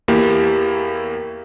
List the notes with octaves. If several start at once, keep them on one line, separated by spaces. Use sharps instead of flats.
E2 A#3 E4 G4